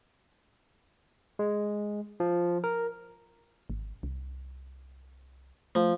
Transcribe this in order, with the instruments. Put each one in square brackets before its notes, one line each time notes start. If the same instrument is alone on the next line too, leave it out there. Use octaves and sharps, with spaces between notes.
[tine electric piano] G#3
F3
A#4
[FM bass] G#1
C2
[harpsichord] F3 [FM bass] A3